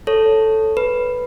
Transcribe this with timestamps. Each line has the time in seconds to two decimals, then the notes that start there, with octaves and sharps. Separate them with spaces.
0.07 A4 C#5
0.77 B4